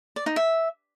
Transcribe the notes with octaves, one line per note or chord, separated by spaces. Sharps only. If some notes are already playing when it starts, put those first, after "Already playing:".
D5
D#4
E5